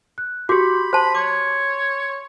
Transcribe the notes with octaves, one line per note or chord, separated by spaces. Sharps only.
F#6
F#4 G4 B5 C6 D6 G6
C5 A5 B5 C6
C#5 D6